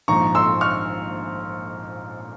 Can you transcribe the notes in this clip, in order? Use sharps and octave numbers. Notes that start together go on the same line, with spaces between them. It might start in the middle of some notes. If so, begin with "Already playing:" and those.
A#1 G#2 F3 A#5 C#6
C6 E6
C#6 F6